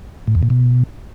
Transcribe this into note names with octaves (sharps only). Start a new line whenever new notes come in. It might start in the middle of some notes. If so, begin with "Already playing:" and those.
A2
E2
A#2
B2